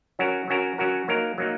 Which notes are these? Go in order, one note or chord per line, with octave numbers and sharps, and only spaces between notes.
F#3 C#4 F#4 A#4
F#3 C#4 F#4 A#4
F#3 C#4 F#4 A#4
F#3 A#3 D#4 A#4
F#3 A#3 D#4